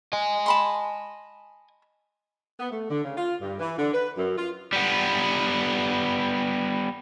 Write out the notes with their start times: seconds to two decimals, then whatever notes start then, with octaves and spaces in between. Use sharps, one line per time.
0.13 D#5 G#5
0.46 A5 B5 C6
2.60 B3
2.71 A3
2.90 D3
3.04 C#3
3.17 F4
3.41 G2
3.60 E3
3.79 D3
3.94 B4
4.17 F#2
4.37 F4
4.73 G3 B3